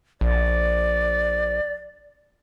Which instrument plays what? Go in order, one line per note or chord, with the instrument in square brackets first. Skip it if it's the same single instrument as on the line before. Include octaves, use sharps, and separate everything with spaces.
[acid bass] A#1 [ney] D5